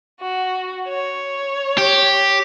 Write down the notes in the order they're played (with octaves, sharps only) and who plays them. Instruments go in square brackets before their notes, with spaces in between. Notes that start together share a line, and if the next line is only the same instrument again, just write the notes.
[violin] F#4
C#5
[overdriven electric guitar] G4